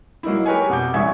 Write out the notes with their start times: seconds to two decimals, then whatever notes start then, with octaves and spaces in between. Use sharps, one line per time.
0.23 F#3 A#3 D#4 E4
0.46 G4 A#4 B4 C#5 G#5
0.69 F2 B2 F#5 D6 G6
0.94 A1 G3 E5 G#5 C#6 G#6